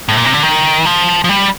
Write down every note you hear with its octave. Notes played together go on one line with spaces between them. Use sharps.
A2
A#2
C3
D3
D#3
F3
F3
G3